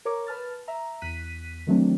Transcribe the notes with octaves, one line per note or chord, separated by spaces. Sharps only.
A#4 C#5 A#5 D6
B4 A5 F6 A6
E5 A#5
E2 F#6 B6 D#7
D#3 E3 F#3 A3 C4 D4